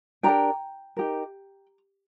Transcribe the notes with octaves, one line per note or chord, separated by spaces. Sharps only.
D4 G4 A#4 G5 A#5
D#4 G4 A#4